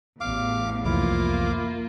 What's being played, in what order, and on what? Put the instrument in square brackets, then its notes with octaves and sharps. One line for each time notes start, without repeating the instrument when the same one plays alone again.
[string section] A1 E2 [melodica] F5 D6
[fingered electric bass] C2 F2 E3 [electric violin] A#3 F4 [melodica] E4 F5 D6